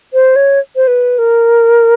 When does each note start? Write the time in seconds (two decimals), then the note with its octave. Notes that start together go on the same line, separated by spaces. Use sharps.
0.14 C5
0.36 C#5
0.76 C5
0.88 B4
1.18 A#4